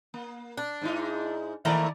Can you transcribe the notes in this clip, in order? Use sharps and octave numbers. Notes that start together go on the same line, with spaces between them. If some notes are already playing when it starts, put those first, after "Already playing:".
A#3
D4
G#2 D#4 E4
D#3 A3 A#3 D5 A#5